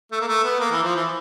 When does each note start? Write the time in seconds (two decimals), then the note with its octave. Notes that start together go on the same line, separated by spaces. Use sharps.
0.12 A3
0.21 A#3
0.27 A3
0.44 B3
0.60 A#3
0.71 E3
0.83 F3
0.96 E3